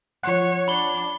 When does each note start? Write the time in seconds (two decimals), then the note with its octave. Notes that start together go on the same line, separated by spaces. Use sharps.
0.23 F3 C#5 F#5
0.68 D4 B5 G7